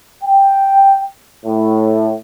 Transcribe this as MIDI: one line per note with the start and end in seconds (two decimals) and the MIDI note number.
0.24 1.03 79
1.46 2.15 45